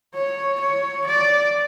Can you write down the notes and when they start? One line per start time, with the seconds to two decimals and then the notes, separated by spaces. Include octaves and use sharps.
0.14 C#5
0.60 C#5
1.07 D5